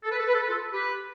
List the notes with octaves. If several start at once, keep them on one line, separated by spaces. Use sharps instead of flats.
A4
B4
A4
B4
A4
B4
F4 A4
G4 B4